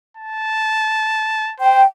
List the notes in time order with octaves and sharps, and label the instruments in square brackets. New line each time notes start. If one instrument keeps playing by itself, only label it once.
[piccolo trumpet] A5
[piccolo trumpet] C5 [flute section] G5